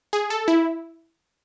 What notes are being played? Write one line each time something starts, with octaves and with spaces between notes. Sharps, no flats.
G#4
A4
E4